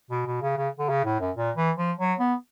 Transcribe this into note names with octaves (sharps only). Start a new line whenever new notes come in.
B2
B2
C#3
C#3
D3
C#3
A2
F#2
A#2
E3
F3
F#3
B3